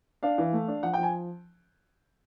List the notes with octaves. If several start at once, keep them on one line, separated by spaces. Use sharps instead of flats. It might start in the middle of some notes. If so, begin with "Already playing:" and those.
D4 F5
E3
A3
D4
F3 F#5
F3 G5
G#5